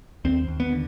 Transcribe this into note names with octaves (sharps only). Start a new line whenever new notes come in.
D#2 C4
D#2
B3
D3